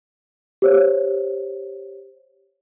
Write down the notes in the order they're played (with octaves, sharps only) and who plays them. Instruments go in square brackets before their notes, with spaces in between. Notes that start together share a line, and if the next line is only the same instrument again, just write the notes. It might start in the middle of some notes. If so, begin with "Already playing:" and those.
[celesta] G4 C5 C#5